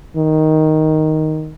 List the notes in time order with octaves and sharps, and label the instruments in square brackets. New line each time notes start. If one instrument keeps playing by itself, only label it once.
[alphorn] D#3